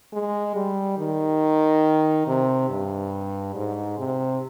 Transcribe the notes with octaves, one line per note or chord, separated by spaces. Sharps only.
G#3
G3
D#3
C3
G2
G#2
C3